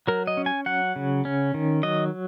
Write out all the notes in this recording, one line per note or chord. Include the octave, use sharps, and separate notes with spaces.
F#3 A#4
D#5
C#4
G#5
F#3 F#5
C#3
C#4
D#3
F#3 D#5